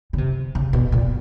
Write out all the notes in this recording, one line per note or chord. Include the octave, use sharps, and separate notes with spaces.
C#3
C3
C#3
B2
A#2